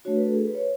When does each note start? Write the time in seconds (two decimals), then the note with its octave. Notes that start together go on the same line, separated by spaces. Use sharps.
0.05 A3 D4 F#4 C#5
0.16 B4
0.26 A4
0.36 G#4
0.46 B4
0.55 C#5